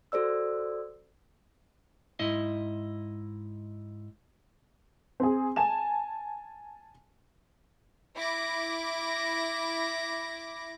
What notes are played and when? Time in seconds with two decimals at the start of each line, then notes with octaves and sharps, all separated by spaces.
0.12 F#4 A4 C5 D5 E6
2.19 G#2 E4 D#5
5.20 C4 G#4
5.56 G#5 A5 E7
8.15 E4 D6 A#6